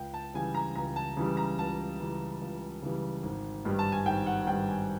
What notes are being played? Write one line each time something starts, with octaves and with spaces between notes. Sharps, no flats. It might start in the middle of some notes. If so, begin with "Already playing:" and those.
Already playing: C#2 G5
A5
C#3 E3 G3 G#5
A#5
C#2 A#5
A5
C#3 E3 G3
A#5
C#2 A5
C#3 E3 G3
C#2
C#3 E3 G3
G#1
G2 D#3 G3
A5
G#5
G#1 G5
F#5
G2 D#3 G3 G5
G#5